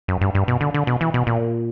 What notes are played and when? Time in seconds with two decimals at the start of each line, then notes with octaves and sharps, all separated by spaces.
0.08 F#2
0.21 G2
0.35 G2
0.48 B2
0.61 D3
0.74 D3
0.87 B2
1.01 E3
1.14 B2
1.27 A#2